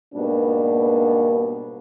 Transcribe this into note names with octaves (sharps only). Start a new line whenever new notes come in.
G#2 B2 G3 A#3 B3 D4